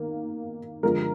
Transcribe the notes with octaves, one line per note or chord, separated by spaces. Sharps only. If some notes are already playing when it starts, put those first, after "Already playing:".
Already playing: D#3 A#3
D3 F3 G#3 A#4